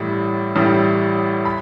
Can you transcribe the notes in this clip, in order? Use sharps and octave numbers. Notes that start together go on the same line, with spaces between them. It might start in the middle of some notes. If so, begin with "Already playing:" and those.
Already playing: A1 A2 G3
A1 A2 G3
B5